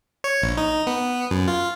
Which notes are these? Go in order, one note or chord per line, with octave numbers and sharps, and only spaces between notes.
C#5
A#1
D#4
B3
F#2
F4